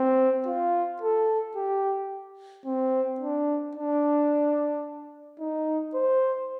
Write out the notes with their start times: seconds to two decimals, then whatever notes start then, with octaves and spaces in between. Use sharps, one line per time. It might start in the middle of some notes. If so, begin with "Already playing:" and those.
Already playing: C4
0.46 F4
1.02 A4
1.56 G4
2.65 C4
3.20 D4
3.76 D4
5.40 D#4
5.94 C5